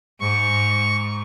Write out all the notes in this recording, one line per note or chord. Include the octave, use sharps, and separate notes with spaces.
G#2 C#6